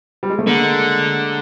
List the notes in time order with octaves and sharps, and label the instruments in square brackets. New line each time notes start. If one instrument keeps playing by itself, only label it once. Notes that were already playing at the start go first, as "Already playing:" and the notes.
[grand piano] G3
G#3
A3
[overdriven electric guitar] D3 [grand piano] G#3 A#3